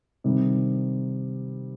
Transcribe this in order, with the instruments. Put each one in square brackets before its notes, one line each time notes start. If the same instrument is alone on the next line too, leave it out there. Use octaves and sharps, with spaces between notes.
[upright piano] C3 D#3 G3